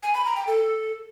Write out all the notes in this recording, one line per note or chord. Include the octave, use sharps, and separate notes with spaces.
G#5
B5
A#5
G5
A4